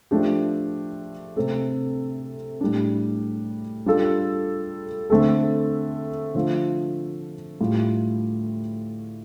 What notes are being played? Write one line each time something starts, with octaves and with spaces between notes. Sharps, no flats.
F3 A3 D4 G4
C3 A3 C4 A4
A2 G3 D4
G3 D4 F4 A4
D3 A3 C4 A4
D3 F3 A3 F4
A2 G3 F4